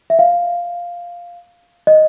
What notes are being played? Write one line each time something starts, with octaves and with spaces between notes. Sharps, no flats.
E5
F5
D#5